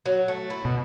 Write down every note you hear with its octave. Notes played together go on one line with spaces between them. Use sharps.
F#3
A3
E4
B2